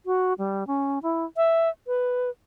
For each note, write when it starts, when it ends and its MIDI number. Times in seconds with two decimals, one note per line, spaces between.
0.06 0.33 66
0.38 0.66 55
0.67 0.99 61
1.03 1.25 64
1.37 1.69 76
1.87 2.30 71